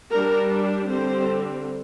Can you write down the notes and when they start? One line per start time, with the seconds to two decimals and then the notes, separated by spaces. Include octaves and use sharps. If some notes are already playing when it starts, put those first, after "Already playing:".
0.11 G3 D4 A#4
0.87 D3 G3 C4 C5